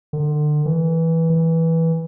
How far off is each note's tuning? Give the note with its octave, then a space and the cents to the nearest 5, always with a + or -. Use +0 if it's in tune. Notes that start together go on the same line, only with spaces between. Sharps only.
D3 +35
E3 -10
E3 -10